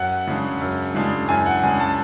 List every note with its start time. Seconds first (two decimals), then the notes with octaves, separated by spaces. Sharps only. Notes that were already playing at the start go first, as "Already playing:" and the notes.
Already playing: F#2 F#5
0.27 C#3 G#3 D4
0.61 F#2
0.94 C#3 G#3 D4
1.29 F#2 G#5
1.46 F#5
1.63 C#3 G#3 D4 G#5
1.80 A5